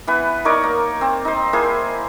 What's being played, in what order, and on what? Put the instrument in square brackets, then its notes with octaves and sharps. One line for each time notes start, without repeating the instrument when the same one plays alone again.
[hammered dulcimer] E3 B3 B4
D#4 A#4 C#5 D5
A#3
C4
D#4 C5
A#3 E4 G#4 C5